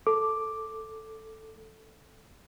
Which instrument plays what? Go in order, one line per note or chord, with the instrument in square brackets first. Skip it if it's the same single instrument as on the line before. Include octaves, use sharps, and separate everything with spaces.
[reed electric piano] A4 D6